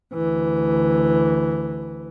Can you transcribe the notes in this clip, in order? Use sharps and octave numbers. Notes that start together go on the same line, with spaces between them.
D2 E3